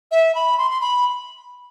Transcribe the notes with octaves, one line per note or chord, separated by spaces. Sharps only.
E5
B5
C6
C6
B5